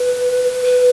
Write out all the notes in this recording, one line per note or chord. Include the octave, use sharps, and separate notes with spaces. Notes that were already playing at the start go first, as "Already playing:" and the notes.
Already playing: B4
B4